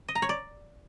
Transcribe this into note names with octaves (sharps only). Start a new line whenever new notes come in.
D#5
A#5
C#5
D5